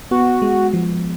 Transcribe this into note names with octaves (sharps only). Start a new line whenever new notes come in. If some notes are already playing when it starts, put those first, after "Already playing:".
B3 F#4
G#3
F3